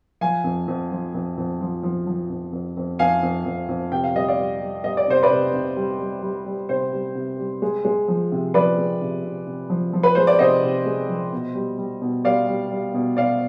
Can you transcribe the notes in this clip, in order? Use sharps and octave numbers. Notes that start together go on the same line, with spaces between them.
F3 F5 G#5
F2
F2
F3
F2
F2
F3
F3
F3
F2
F2
F2
F2 F5 G#5
F2
F2
F2
C3 G5
F5
G3 D#5
D5 F5
G3
G3
G3 D#5
D5
C3 C5
B4 D5
C3
C3
G3
G3
G3
G3
C3 C5
G3
C3
G3
G#3
G#3
F3
C3
F3 B4 D5
G#3
C3
C3
C3
F3
F3
B4
G#3 C5
D5
C3 C5 D#5
C3
G#3
F3
B2
G3
G3
B2
G3 D5 F5
G3
G3
B2
B2 D5 F5